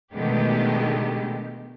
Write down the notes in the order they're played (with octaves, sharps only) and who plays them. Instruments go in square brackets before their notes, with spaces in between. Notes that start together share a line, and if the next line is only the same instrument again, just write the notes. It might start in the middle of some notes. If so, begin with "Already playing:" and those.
[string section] B2 D3 D#3 G#3 A3 G4